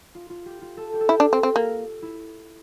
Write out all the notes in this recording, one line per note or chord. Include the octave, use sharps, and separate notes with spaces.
F4
F4
G4
F4
A4
G4
A4
E4 G4
D4
C4
C4
A#3
E4